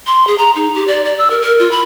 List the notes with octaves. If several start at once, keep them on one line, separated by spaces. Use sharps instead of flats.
C6
G#4
A#5
D#4
G4
D5
D5
E6
A#4
A#4
F4
B5